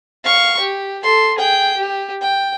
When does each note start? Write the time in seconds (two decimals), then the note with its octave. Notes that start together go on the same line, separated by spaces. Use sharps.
0.24 F5 C#6
0.59 G4
1.04 A4 C6
1.37 G#4 G5
1.77 G4
2.21 G5